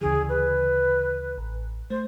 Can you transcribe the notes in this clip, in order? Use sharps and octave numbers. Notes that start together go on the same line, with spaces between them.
D2 C#3 E3 G#4
B4
A1
A3 C5